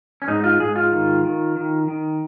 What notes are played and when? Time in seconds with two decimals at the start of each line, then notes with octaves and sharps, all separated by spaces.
0.22 C#4
0.28 G#2 D#4
0.44 F4
0.60 G#2 G#4
0.76 F4
0.91 D#3
1.24 D#3
1.56 D#3
1.88 D#3